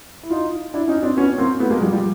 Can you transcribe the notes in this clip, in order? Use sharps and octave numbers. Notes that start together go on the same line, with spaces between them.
E4
D#4 F4
D4 E4
C#4 D#4
C4 D4
B3 C#4
A#3 C4
A3 B3
G#3 A#3
F3 G3
F3 G3